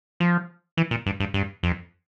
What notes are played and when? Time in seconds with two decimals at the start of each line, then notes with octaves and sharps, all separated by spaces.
0.20 F3
0.77 E3
0.91 A#2
1.06 G2
1.20 G2
1.34 G2
1.63 F2